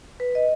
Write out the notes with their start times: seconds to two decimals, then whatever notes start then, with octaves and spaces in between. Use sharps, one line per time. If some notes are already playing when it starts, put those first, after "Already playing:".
0.20 B4
0.35 D#5